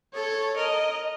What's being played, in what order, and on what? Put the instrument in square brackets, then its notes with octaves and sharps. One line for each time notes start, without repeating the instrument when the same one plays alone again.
[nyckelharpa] A4 [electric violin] C#5
[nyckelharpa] A#4 [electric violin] D#5